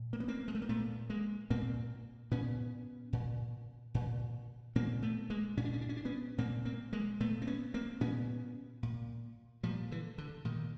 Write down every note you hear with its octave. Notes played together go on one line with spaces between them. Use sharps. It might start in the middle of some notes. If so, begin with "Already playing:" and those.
Already playing: A#2
A#3
B3
A#3 C4
G#3
A3
A#3
A#2 A3 B3
G#3 A#3
A#2 A#3 C4
A#2 B3 C#4
A#2
A#2
A#2 A#3 C4
A3 B3
G#3 A#3
A#2 C#4
D4
C#4
D4
C#4
D4
B3 C#4
A#2 A#3 C4
A#3 C4
G#3 A#3
A#2 A3 B3
C4
B3 C#4
A#3 C4
A#2 B3 C#4
A#2
A#2 F3 G3
D3 E3
D3
A#2 D#3